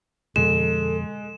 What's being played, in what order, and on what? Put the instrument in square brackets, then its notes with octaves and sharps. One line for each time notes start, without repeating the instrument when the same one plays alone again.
[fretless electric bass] F2 B2 D3 [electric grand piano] G#3 [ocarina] A4 [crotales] E7